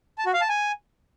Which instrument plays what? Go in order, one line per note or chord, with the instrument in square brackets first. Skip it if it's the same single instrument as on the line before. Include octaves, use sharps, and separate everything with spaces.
[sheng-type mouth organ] A5
F#4
F5
A5
G#5